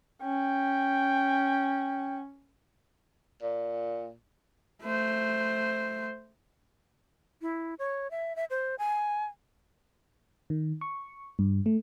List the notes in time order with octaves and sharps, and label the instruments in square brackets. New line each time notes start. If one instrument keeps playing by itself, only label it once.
[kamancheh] C#4 [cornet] G5
[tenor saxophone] A#2
[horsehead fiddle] A3 C5
[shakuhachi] E4
C#5
E5
E5
C5
G#5
[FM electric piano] D#3
C#6
G2
A3